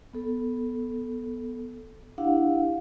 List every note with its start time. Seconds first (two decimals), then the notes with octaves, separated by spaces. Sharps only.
0.13 B3 A4
2.18 D4 E4 G4 F5 F#5